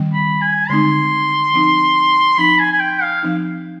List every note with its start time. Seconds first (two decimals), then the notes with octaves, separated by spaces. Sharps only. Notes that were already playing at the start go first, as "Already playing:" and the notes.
Already playing: D#3 G3 C4
0.13 B5
0.42 G#5
0.69 D3 G#3 C4 D#4 C6
1.53 F3 C4 D#4
2.38 F3 C4 D#4 B5
2.59 G#5
2.72 G#5
2.80 G5
3.02 F5
3.23 F3 C4 D#4